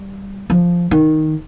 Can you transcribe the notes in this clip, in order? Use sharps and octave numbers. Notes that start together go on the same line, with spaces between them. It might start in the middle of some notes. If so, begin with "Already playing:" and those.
Already playing: G3
F3
D#3